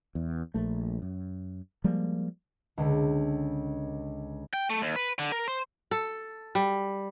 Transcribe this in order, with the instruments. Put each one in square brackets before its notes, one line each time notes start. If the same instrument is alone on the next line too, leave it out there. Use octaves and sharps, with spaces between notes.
[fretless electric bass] E2
A#1 A3
F#2
F3 G3 G#3 A#3
[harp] C#2 D3
[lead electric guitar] G5
A3
D#2
B4
D3
A#4
C5
[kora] A4
G3